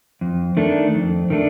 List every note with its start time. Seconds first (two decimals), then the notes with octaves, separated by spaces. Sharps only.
0.21 F2
0.57 D#3 A3 D4
0.94 F2
1.30 D#3 A3 D4